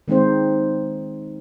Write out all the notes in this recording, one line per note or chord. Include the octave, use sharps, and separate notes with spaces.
D#3 G#3 C4 D#4 C5